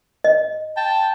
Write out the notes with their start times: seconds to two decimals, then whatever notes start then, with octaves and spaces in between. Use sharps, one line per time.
0.24 D#5
0.77 G5 A5